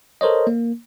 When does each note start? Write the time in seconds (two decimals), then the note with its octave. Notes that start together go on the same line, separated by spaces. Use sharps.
0.21 A4 A#4 C5 C#5 D#5
0.47 A#3